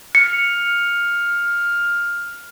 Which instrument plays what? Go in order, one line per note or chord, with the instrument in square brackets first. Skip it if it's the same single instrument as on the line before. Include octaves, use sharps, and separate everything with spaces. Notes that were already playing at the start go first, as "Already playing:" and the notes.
[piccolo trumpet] F6 [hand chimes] C#7